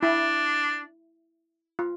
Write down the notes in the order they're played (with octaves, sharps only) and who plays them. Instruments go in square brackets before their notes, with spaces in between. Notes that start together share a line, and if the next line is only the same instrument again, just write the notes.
[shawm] D4 [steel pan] E4
[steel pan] F4